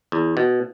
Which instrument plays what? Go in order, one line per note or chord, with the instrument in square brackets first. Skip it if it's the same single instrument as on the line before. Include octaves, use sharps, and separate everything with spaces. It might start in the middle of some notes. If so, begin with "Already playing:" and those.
[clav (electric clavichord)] E2
B2